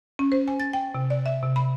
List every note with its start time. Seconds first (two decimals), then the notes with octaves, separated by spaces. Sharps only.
0.19 C#4
0.32 C5
0.48 G#5
0.60 A6
0.73 G5
0.95 C3
1.10 D5
1.26 E5
1.42 C3
1.56 B5